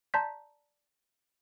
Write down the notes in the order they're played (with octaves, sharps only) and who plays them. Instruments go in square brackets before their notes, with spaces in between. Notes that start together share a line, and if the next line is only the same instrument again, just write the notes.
[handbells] D5 A5 A#5 C6 G6 B6